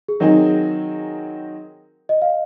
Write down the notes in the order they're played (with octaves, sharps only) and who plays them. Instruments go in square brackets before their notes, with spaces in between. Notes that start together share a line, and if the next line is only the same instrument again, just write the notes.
[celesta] G#4
[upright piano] D#3 F#3 C4 D#4 G#4 [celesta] A#4
[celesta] D#5
F5